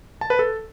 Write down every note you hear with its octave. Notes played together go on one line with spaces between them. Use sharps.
A5
B4
A4